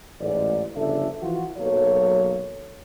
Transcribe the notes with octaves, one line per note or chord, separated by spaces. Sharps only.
A1 G#2 D5
G1 C#3 F3 D4 A4 E5
E3 F3 F4 F#4
B1 F#3 A#3 A4 C#5